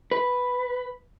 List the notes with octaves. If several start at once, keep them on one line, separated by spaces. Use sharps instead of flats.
B4